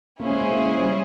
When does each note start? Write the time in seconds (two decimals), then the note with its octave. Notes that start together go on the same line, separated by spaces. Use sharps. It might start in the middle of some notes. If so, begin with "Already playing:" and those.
0.20 A#3 C#4 E4 G#4 C5
0.30 G#3
0.41 G#3
0.50 A#3
0.66 G#3
0.77 G#3
0.82 G3